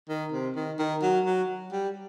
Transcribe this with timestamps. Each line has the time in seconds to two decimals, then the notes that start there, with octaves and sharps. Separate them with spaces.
0.09 D#3
0.33 C3
0.56 D#3
0.79 D#3
1.03 F#3
1.26 F#3
1.72 G3